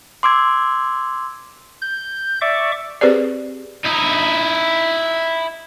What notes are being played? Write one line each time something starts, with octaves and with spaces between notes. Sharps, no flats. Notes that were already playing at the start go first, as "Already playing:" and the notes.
C6 D6 E6 G#6
G6
D5 E5 C#6 D6
C4 G4 G#4 B4 C5 D5
D#4 E4